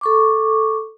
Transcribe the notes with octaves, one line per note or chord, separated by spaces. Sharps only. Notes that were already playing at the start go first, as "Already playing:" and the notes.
A4 C#6 D6